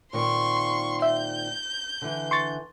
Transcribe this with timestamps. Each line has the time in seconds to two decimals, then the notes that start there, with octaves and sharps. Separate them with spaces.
0.13 A#2 D#3 C4 C6 C#6
1.02 E5 G6
2.02 D3 E3
2.31 C6 C#6 A6